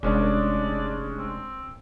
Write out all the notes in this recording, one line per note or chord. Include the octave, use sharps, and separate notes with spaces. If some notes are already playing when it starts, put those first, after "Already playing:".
F1 G#3 C#4 D4 D5
C4